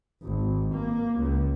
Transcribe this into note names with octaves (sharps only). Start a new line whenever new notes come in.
G#1
A#3
C#2